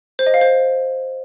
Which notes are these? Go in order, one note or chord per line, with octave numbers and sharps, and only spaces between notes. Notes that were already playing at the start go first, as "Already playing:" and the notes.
C5
D#5
F5
C5